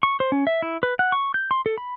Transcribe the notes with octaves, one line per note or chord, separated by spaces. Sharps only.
C#6
C5
C#4
E5
E4
B4
F#5
C#6
G6
C6
A4
B5